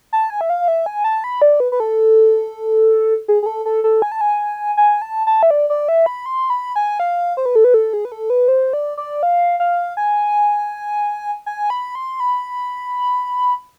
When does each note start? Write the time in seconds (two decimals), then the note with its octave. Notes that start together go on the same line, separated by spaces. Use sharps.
0.13 A5
0.30 G#5
0.41 E5
0.50 F5
0.68 E5
0.86 G#5
1.04 A5
1.24 B5
1.42 D5
1.60 B4
1.72 B4
1.80 A4
3.28 G#4
3.43 G#4
3.46 A4
3.66 A4
3.84 A4
4.02 G#5
4.12 A5
4.21 G#5
4.77 G#5
5.02 A5
5.27 A5
5.43 E5
5.50 D5
5.70 D5
5.88 E5
6.06 B5
6.26 C6
6.50 B5
6.76 G#5
7.00 F5
7.37 C5
7.46 B4
7.56 A4
7.64 B4
7.74 A4
7.93 G#4
8.05 B4
8.12 A4
8.30 B4
8.48 C5
8.73 D5
8.97 D5
9.23 F5
9.60 F5
9.97 G#5
11.46 G#5
11.70 B5
11.95 C6
12.20 B5